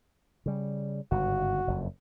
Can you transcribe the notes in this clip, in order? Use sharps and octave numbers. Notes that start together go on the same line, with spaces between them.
C#3 G3
G1 G#2 C#3 F#4
F#1 F2